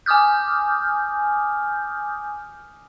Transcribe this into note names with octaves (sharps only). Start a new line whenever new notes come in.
G#5 D6 D#6 F6 G6